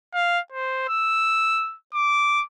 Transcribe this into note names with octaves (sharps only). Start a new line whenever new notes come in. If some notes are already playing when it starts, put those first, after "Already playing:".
F5
C5
E6
D6